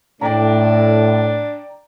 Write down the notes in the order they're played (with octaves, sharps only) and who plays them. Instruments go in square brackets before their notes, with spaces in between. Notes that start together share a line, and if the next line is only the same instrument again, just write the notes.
[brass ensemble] A2 [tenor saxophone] D4 [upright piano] D5 G5 A#5